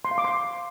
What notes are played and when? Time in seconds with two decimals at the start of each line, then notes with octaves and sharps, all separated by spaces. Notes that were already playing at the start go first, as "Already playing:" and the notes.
0.05 C6
0.11 F5
0.18 D6
0.24 C6